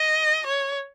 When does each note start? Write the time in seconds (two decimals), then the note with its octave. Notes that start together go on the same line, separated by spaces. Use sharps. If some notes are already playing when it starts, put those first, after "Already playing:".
Already playing: D#5
0.46 C#5